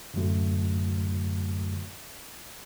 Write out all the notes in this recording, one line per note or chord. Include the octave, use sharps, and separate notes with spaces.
F#2 A2 D3 F#3 A3 F#4